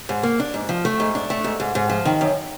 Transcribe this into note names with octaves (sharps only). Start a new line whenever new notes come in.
G#2
A#3
D4
G#2
F3
A3
G#2
D4
A3
G#2
G#2
G#2
F3
D#3
F#2